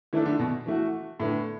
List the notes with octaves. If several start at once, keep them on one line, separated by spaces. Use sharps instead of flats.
E3 A3 D4 A4
D3
B2
E3 A3 F#4
A2 D3 B3 E4